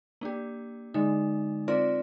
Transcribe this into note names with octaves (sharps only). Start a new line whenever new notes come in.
A#3 D4 G4
D3 G#3 D#4
C4 F4 A#4 D5